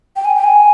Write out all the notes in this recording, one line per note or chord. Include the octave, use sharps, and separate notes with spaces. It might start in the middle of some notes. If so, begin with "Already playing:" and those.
G5
G#5
G5
G#5